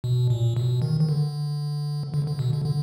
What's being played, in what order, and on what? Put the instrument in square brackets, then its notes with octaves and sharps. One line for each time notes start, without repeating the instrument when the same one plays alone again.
[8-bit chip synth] B2
A#2
B2
D#3
D#3
D3
D3
D3
B2
D3
D3